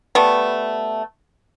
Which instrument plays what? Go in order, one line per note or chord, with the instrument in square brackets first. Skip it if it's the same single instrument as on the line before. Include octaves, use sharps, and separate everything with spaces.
[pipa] G3 A3 B3